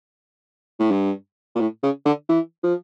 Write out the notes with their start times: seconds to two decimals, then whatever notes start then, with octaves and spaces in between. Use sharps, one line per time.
0.79 A2
0.91 G2
1.55 A#2
1.60 A2
1.83 C#3
2.05 D3
2.29 E3
2.63 F3